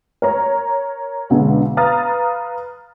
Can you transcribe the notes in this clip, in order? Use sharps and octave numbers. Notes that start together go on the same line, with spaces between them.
A#4 C#5 A#5
B1 E2 D3 G#3
B4 F5 A#5 D#6 F6 A6